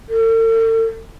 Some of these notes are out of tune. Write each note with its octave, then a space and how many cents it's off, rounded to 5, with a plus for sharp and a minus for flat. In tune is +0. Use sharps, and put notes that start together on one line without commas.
A4 +45